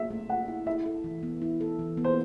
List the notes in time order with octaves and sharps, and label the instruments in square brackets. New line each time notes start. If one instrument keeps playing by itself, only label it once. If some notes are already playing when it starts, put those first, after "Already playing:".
Already playing: [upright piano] E5
[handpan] A3
[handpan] A3 [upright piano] F#5
[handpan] E4
[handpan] E4 [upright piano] E5
[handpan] A4
E3
B3
E4
A4
E3
B3
[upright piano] C5